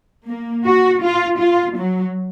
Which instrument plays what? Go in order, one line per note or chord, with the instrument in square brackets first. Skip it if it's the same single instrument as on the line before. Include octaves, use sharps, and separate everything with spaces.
[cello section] A#3
F#4
F4
F4
F#3